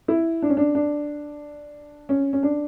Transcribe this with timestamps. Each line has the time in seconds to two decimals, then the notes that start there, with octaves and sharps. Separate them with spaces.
0.08 E4
0.42 D4
0.50 C#4
0.57 D4
0.75 D4
2.09 C#4
2.33 C#4
2.43 D4